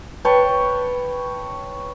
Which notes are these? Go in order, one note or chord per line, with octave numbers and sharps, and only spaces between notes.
B4 C#5 G5 A5